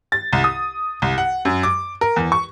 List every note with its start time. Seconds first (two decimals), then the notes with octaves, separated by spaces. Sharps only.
0.12 A6
0.33 C2
0.44 D#6
1.02 C2
1.18 F#5
1.45 F#2
1.63 D6
2.01 A#4
2.16 E2
2.32 C#6